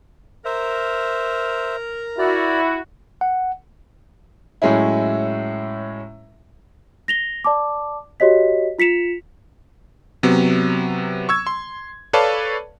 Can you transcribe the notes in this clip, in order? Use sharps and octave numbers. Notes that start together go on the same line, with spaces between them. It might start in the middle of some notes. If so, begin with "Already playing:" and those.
A#4 C5 E5
E4 F#4 D5
F#5
A2 F#3 G#3 C#4 E4
A#6 F7 G7
D5 A5 D6
F#4 G4 C#5 D#5 B6
F4 B6 C#7 E7 F7
C3 F#3 B3
C#6 E6 G#6
C6
A4 B4 C#5 D5 F5 A5